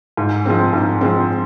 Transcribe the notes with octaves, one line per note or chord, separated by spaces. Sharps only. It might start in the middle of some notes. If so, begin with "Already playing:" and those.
G#2
F3 G#3 C4
G#2
F3 G#3 C4